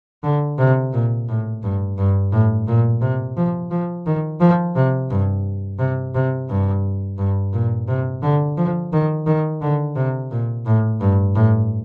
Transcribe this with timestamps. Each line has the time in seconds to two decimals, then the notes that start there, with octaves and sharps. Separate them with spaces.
0.24 D3
0.58 C3
0.93 A#2
1.28 A2
1.63 G2
1.98 G2
2.32 A2
2.67 A#2
3.01 C3
3.37 F3
3.71 F3
4.06 D#3
4.40 F3
4.75 C3
5.10 G2
5.79 C3
6.15 C3
6.49 G2
7.18 G2
7.53 A#2
7.88 C3
8.22 D3
8.57 F3
8.92 D#3
9.26 D#3
9.61 D3
9.96 C3
10.31 A#2
10.66 A2
11.00 G2
11.35 A2